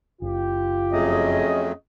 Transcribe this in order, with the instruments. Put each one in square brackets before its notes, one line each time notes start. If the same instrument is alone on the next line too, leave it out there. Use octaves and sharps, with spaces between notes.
[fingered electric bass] F#1 [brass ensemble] F4 G4
[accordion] F2 F#3 A3 [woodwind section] C#4 G#4 D#5